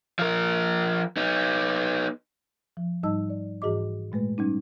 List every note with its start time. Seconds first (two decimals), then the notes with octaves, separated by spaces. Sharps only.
0.19 F3 A#4
1.17 B3 D#4
2.77 F3
3.03 G#2 G3 D#4 D#5 A5 E6
3.30 D5
3.62 G#2 E3 F#4 G#4 D#5 D6
4.12 A#2 G#3 A3 B4
4.38 G3 C#4 D#4